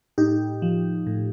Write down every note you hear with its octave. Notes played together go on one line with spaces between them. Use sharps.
A2 D#4 G4
F3
A2